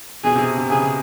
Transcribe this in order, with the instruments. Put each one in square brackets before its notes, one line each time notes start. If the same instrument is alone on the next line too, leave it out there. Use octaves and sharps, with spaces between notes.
[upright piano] B2 [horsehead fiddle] G#4
[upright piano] C3
C3
[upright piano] C#3 [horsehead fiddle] G#4